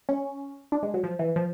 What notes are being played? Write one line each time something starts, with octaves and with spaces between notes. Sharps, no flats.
C#4
D4
G#3
F#3
F3
E3
F3